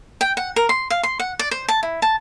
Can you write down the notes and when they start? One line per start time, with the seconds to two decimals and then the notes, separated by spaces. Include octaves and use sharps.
0.21 G5
0.37 F#5
0.56 A#4
0.69 C6
0.90 F5
1.03 C6
1.19 F#5
1.39 D5
1.51 C5
1.68 A5
1.83 E4
2.02 A5